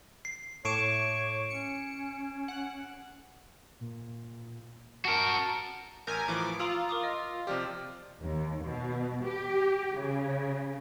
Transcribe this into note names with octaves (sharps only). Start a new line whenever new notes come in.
C7
A2 C#5 C#6 D6 C7 D7 E7
C#4 C#7
F#5
A#2
F#4 A#4 A5
A1 A#4 G#5 G6
A2 E3 F3 D6
F4 A#5 D#6 E6 F#7
A#4 D6 D#6
D#5
C3 F3 G4 D5 F6
D#2
B2
G4
C#3